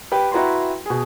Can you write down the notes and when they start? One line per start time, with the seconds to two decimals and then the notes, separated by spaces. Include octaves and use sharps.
0.12 G4 B4 G5
0.32 E4 F#4 B4 G5 A#5 C6
0.86 B2 G#4